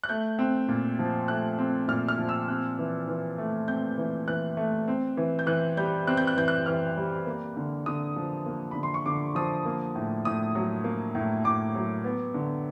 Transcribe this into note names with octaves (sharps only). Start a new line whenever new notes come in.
F#6
A3 G6
C4
A#2
F3
A3 F#6
C4
A#2 F6
F6
F3
E6
C4 F#6
E3
E3
A3
C4 G6
E3
E3 F#6
A3
C4
E3
G6
E3 F#6
G3 G6
C4 F#6
G6
F#6
E3 G6
F#6
E3 F6
G3
A#3
D3
D3 D#6
F3
A#3
D3 B5
C6
C#6
D3 D6
F3 D#6
A#3
A2
A2 D#6
F#3
A#3
A2
A2 D6
F#3
B3
D3